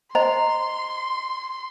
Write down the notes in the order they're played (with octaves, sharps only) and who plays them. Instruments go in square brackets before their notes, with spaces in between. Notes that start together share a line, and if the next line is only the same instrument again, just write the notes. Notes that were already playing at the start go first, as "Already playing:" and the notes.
[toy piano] C5 D#5 [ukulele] A#5 [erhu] C6